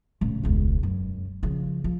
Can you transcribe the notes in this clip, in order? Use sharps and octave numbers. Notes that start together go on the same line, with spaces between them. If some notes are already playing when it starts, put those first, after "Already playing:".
D1 C#3
E1 C#2
F#2
C#3 F3
F3